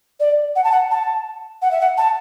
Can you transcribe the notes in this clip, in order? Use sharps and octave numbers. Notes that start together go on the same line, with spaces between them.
D5
F#5
A5
F#5
A5
F#5
E5
F#5
A5